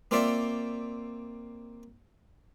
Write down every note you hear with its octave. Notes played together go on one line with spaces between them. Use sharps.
A#3 C4 F4 C5 D5 E5